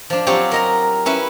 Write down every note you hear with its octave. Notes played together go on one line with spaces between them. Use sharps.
F3 D4
F#3 C4 F4 G4 C#5
A#4 D#5 A#5
C#4 E4 B4